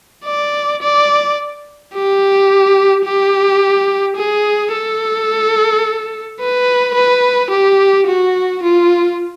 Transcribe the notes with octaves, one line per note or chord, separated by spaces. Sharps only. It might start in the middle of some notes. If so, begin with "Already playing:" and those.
D5
D5
G4
G4
G#4
A4
B4
B4
G4
F#4
F4